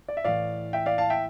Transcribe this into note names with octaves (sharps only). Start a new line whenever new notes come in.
D5
E5
A2 E3 D5 F5
E5 G5
D5 F5
F5 A5
E5 G5